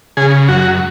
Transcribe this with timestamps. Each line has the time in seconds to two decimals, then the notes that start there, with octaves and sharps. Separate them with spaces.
0.17 C#3 G#4
0.48 F#2 F#4